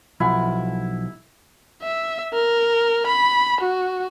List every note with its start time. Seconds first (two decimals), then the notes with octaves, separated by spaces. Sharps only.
0.20 B1 F3 E4 F#5 G#5
1.82 E5
2.33 A#4
3.07 B5
3.61 F#4